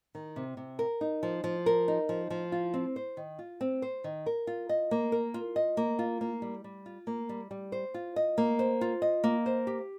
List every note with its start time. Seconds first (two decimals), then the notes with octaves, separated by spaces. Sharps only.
0.15 D#3
0.36 C3
0.57 C3
0.79 A#4
1.01 D#4
1.23 F3
1.44 F3
1.66 A#4
1.88 D#4
2.09 F3
2.30 F3
2.52 F4
2.74 C4
2.96 C5
3.17 D#3
3.39 F4
3.61 C4
3.82 C5
4.04 D#3
4.26 A#4
4.47 F4
4.69 D#5
4.91 A#3
5.12 A#4
5.34 F4
5.56 D#5
5.77 A#3
5.99 F4
6.21 A#3
6.42 G3
6.64 G3
6.86 F4
7.07 A#3
7.29 G3
7.51 G3
7.72 C5
7.94 F4
8.16 D#5
8.38 A#3
8.59 C5
8.81 F4
9.02 D#5
9.24 A#3
9.46 C5
9.67 G4